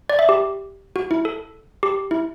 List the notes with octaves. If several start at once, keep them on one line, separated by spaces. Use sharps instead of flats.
D5
E5
G4
F#4
E4
A4
G4
E4